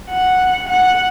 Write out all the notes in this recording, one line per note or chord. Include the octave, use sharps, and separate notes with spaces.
F#5
F#5